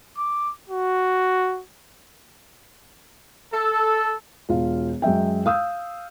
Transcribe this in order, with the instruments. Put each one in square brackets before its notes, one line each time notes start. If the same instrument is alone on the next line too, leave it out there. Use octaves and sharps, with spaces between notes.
[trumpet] D6
F#4
[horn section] A4
[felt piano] E1 F4 F5
F#2 G#3 E5 G5
F5 D#6 E6 G6